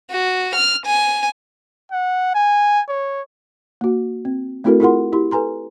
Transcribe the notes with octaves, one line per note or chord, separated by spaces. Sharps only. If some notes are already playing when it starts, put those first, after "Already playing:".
F#4
F6
G#5
F#5
G#5
C#5
A#3 F#4
C4
A3 C4 E4 F#4 A4 A#4
E4 F4 G#4 A#4 F#5 C6
E4 G4 C6
A4 B4 G#5 A#5 C6